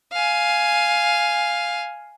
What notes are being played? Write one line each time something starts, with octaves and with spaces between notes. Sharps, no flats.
F5 G#5